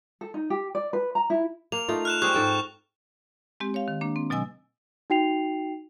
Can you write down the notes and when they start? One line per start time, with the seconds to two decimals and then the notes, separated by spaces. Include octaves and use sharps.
0.21 A4
0.34 D#4
0.50 G4
0.75 D5
0.93 B4
1.15 A#5
1.30 E4
1.72 A#3 F7
1.88 A3 D#4 F4
2.05 F6 F#6 E7
2.22 G3 C4 G#4 C#6 F#6
2.34 G#2 A4 G5
3.60 G#3 C4 G4
3.74 C#5 F5
3.88 D#3
4.01 A#3 D4
4.16 C4
4.30 B2 F#3 D#5 G#5 E6
5.10 D#4 F#4 G5 C7 F7